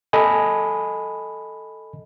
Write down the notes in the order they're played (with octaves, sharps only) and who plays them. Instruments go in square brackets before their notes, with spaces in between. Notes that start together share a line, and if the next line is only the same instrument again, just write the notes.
[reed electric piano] A4 D#5 G#5 B5